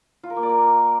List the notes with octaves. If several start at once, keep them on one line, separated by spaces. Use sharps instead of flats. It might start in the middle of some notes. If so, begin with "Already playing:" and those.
F4
A#4
A#3
D5
A#4